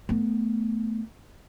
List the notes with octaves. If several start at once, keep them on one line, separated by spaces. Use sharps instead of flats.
A3 B3